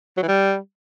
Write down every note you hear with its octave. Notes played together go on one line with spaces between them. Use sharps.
F#3
E3
G3